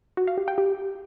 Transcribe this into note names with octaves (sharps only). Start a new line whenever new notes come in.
F#4
F5
G4
G5
G4